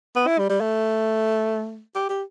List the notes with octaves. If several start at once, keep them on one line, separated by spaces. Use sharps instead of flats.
B3
E4
G3
G3
A3
G4
G4